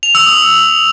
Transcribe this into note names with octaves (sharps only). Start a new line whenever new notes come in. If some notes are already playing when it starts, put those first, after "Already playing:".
F7
E6
D#6